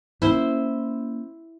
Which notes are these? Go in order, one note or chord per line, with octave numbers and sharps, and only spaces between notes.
A#3 C#4 E4 C5